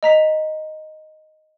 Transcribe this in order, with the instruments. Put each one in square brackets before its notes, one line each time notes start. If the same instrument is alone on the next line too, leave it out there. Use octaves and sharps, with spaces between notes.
[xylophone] D#5 A#5 B6